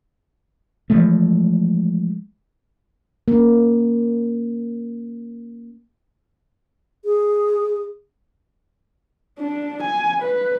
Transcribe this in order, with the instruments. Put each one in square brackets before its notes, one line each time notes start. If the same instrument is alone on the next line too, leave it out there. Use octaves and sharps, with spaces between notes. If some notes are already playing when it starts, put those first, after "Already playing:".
[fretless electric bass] E3 F3 G#3 A3
[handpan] A#3 C#4
[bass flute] G#4
[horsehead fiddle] D4
G#5
B4